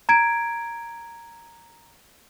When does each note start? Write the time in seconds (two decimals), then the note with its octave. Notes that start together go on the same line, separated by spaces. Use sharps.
0.09 A#5 G#6 D7